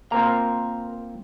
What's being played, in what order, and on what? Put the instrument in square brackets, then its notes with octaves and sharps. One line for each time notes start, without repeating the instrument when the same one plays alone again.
[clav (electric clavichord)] A#3 C4 F4 [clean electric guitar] A#4 A#5